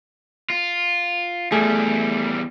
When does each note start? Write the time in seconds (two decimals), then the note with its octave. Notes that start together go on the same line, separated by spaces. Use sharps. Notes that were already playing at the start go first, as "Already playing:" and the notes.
0.50 F4
1.52 E2 G3 A3 G#4